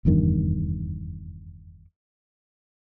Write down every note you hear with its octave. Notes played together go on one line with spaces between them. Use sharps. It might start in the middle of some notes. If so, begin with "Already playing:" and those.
F1 E2 G2 D#3